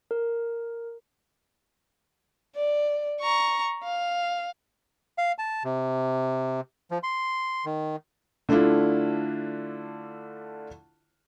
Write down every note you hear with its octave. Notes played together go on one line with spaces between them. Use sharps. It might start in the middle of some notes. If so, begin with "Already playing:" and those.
A#4
D5
A#5 C#6
F5
F5
A5
C3
F3
C6
D#3
D3 A3 D4 E4 F4